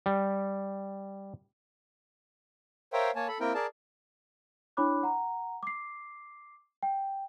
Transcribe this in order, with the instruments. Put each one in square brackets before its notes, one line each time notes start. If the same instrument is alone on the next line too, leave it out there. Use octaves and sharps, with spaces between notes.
[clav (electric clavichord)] G3
[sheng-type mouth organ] A#4 C5 C#5 E5 F5 G5
A#3 C#5 G#5 A5
A4 B5
A#3 C4 E4 A#4 G5
G#4 A#4 D5 A5
[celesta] D4 E4 C#5 B5 D6 F#6
F#5 A#5
D6 C7
G5